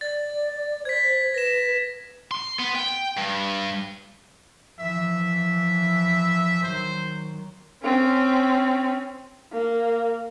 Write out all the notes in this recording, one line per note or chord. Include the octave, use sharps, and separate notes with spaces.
D5 A6
C5 G#6 B6
B4 A#6 E7
C6
B3
G5
G2
E3 F3 E5
D#3 F#3 C5
C4 C#4
A#3